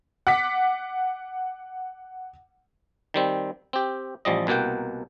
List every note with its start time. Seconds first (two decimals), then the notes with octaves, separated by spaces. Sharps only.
0.27 F#5 D6 B6
3.14 D#3 G3 C4
3.73 C4 G4
4.25 A1 F3 G3 D#5
4.47 C2 B2 A#3 F#5 G5